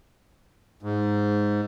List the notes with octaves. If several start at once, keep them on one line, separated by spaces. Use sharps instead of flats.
G#2